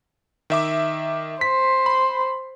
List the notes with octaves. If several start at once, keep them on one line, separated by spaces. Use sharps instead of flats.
D#3 E5 D6
C5 B6
B5